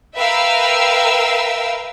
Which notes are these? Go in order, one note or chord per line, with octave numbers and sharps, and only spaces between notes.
A#4 B4 E5 F5 G5 E6